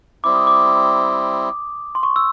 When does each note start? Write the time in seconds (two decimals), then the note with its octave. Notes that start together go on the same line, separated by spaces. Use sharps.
0.24 G3 C4 E4 D6
0.35 D#6
0.47 D6
1.95 C6
2.03 C#6
2.16 E6